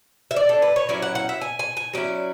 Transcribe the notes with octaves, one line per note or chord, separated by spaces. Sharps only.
E5
D5
A4
B4
C#5
F#3 C#4 E4 D5
F#5
F#5
E5
G#5
G#5
G#5
F#3 C#4 E4 D5